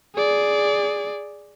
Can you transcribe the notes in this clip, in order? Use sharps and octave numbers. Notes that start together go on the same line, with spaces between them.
G#4 D5